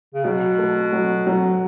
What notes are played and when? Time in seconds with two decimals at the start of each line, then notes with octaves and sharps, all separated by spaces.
0.14 C#3
0.24 B2 F#3
0.58 A3
0.93 F#3
1.27 F#3